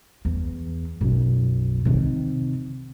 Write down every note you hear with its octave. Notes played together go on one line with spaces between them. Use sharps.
E2
B1 F#2
C3 D#3